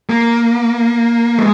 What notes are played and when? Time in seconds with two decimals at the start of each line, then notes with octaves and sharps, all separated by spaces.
0.10 A#3
1.38 G#3